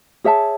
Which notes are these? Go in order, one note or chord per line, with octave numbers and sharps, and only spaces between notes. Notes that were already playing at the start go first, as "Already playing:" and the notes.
G#4 C#5 E5 A5